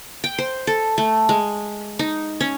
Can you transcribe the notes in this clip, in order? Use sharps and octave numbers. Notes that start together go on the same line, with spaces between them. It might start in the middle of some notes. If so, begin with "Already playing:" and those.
G5
C5
A4
A3
G#3
D#4
C#4